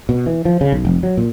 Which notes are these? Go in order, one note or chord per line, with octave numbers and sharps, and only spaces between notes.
B2
E3
F3
C#3
B1
F1
F#3
A#2